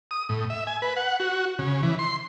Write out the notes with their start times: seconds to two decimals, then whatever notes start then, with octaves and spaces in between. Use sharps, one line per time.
0.11 D#6
0.29 A2
0.50 E5
0.67 G#5
0.82 B4
0.97 F#5
1.20 F#4
1.59 C#3
1.83 E3
1.99 C6